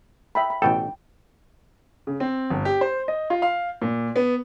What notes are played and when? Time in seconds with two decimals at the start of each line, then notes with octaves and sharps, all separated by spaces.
0.35 E5 G5 B5
0.50 B5
0.62 A1 B2 A4 G5
2.07 C#3
2.20 C4
2.50 G1
2.65 G4
2.81 C5
3.08 D#5
3.30 F4
3.42 F5
3.82 A#2
4.16 B3